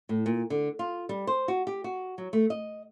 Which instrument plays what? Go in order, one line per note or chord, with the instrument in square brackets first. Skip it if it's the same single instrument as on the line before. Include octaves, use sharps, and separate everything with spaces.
[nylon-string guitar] A2
A#2
D3
F4
G3
C5
F#4
G4
F#4
F#3
A3
D#5